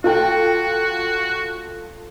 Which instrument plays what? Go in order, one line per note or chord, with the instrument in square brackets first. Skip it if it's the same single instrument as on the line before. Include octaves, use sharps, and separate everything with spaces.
[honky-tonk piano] F4 A4 G5 [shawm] F#4